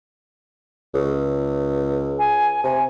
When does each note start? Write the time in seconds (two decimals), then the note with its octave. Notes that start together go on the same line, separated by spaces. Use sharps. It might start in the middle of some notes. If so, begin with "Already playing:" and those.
0.94 C#2
2.19 G#5
2.64 C3 G#5